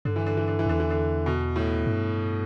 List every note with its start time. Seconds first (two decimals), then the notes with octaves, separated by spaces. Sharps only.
0.05 G2 D3
0.16 E3
0.26 D3
0.37 E3
0.47 D3
0.59 E3
0.65 E2 D3
0.80 E3
0.90 D3
1.26 B2
1.56 A2
1.86 G2